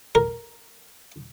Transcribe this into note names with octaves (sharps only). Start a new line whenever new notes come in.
A#4